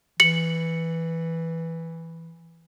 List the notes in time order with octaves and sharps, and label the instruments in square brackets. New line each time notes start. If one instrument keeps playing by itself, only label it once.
[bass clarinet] E3 [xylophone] C#7 F#7